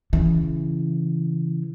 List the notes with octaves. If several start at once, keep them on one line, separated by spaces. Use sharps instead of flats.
C#3 E3